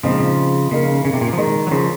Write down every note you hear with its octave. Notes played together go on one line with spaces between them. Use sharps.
A#2 C#3 F3 G#3 C4 D#4
C#3 A#3 D#4 A#4
C#3
C3
A#2
F3
D#3 G#3 D#4 A#4
F#3
C#3 F3